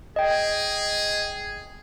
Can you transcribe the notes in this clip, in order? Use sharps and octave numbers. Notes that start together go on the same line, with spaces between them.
G#4 D#5 G5